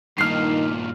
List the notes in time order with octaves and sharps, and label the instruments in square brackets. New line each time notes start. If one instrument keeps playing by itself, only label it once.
[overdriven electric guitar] G2 A#2 [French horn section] D#3 [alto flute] D#4 [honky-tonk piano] F6 C7